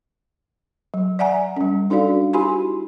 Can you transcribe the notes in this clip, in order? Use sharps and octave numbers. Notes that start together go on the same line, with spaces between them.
F#3
D5 E5 F#5 G#5 A#5
G3 C#4
D4 D#4 F#4 A4 D5 F5
E4 F#4 G4 G#5 B5 C6